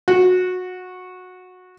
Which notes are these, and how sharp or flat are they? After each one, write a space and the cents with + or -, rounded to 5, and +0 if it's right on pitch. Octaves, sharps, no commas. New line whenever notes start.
F#4 -20